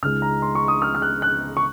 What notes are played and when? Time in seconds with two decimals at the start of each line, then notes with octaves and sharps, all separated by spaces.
0.02 C#2 C#3 G#3 D#4 F6
0.22 A#5
0.42 C6
0.55 C#6
0.68 D#6
0.82 F6
0.95 F6
1.02 F#6
1.22 F#6
1.57 C#6